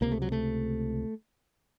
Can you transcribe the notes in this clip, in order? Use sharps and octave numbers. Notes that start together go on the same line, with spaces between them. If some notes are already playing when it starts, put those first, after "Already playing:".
C#2 C3 A#3
A3
F#3
A3